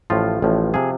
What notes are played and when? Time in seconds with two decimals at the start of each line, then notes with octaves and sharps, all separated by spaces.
0.10 A1 A2 F3 F4
0.42 A1 A2 F3
0.74 C3 F3 G#4